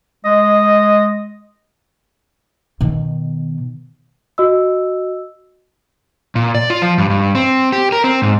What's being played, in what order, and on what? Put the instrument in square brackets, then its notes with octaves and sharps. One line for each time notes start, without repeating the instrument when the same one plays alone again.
[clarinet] G#3 [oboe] D#5
[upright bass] B2 D#3
[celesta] F#4 D#5 E6
[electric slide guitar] A#2
D5
F4
F3
G2
G2
C4
G4
A#4
C4
G#2